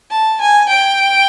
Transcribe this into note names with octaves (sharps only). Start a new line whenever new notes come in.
A5
G#5
G5